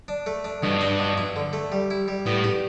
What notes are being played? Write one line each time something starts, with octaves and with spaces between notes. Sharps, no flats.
D4
A3
D4
G2 B2
D4
B2
E4
D3
A3
G3
E4
G3
A2 B3
G4